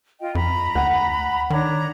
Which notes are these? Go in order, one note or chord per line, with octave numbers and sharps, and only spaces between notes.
F4 D#5 G5
F2 A#5 B5
D2 F#5
D#3 D4 C#5 A#5